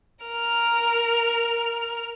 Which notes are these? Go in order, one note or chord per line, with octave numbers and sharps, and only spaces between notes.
A#4 F6